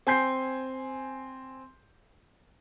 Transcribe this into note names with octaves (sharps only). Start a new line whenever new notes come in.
C4 G#5 C6 G6 C7